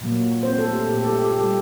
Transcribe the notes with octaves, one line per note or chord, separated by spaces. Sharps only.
A#2 F#3 A#3
C4 C5
A3 A4
G4
A4
A#2 A3 G4
A4
G4
A4
G4
A4
G3 G4